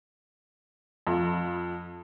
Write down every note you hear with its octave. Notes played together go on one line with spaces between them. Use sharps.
F2